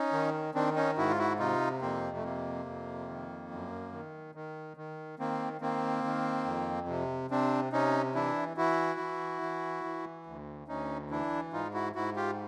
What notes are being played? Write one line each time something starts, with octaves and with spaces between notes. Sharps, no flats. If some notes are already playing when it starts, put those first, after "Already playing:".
Already playing: C#4 D#4
D#3
D#3 C4 D4
C#4 D#4
G#2 E4 F#4
F4
E4 F#4
C3 D#4 F4
F2 A#3 C4
A3
C3 A#3
F2
D#3
F#2
D#3
D#3
D#3
D#3 A#3 C4
D#3 A#3 C4
D#3
F2
C3
C3 C4 D4
C3 C#4 D#4
E3 D4 E4
E3 E4 F#4
E3
E3
E3
D2
D2 C#4 D#4
E3 D4 E4
G#2 D#4 F4
E4 F#4
G#2 E4 F#4
F4 G4